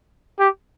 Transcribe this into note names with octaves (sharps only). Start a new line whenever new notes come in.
G4